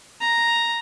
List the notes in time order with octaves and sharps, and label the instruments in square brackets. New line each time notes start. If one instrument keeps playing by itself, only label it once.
[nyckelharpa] A#5